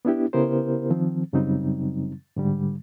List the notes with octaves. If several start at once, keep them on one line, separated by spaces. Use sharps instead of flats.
B3 D4 E4 G4
C#3 B3 E4 G4 A#4 C5
D#3 F3 C4
F#2 C#3 F#3 G3 C4 D#4
G#2 D3 G3